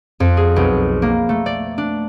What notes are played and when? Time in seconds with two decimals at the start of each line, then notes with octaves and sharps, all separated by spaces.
0.20 F2
0.37 G#4
0.56 B1
1.02 A#3
1.29 A3
1.46 D5
1.78 D4